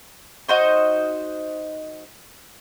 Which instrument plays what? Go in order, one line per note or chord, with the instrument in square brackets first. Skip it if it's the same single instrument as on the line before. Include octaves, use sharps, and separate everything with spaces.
[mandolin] D#4 F#4 C5 D#5